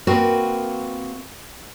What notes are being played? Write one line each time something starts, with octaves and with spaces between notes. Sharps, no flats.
A#3 C4 F#4 A#4 B4